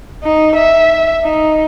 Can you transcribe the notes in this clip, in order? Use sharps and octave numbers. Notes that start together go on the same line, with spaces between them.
D#4
E5
D#4